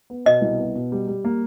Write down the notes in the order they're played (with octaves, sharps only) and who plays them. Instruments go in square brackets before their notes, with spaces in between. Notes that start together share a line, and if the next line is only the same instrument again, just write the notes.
[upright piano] B3
[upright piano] B2 [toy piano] D#5
[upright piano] C2
B3
B2
G3
G3
A#3